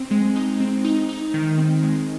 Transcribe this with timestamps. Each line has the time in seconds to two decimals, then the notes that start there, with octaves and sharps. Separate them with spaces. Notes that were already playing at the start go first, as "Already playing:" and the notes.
Already playing: C4
0.11 G#3
0.36 D#4
0.60 C4
0.84 D#4
1.09 D#4
1.34 D#3
1.58 C4
1.83 G#3